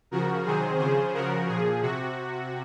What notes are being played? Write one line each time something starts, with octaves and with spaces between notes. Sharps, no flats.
C#3 F3 F#4 A#4
C3 D#3 F#3 G#4 C5
C#3 F3 G#4 C5
C#3 F3 F#4 A#4
A#2 F3 G#4
C3 F#4